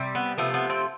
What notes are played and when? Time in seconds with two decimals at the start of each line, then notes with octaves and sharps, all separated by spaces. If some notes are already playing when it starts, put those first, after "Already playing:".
Already playing: C3 G3
0.15 B3
0.38 C3 F3 A3 B3
0.54 B3
0.70 C4